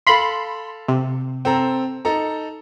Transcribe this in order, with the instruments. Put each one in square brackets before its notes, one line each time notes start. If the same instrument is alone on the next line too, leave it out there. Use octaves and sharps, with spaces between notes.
[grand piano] A4 F5 [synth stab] B5 C6
[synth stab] C3
[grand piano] C4 A4 A#5
D#4 A4 A#5